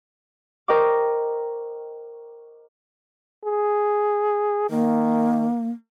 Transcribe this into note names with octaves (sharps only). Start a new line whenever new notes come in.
A#4 C5 D#5 G5 C#6 D6
G#4
D#3 A#3